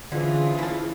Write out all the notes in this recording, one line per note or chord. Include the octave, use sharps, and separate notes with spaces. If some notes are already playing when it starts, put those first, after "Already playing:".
D3 E3 F3 C#4 F4 G#4
E4 A5